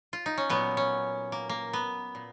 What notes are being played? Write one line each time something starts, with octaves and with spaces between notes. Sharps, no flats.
F4
D#4
C#4
A#2 F#3 B3
C#4
A#3
A#3
B3
A#2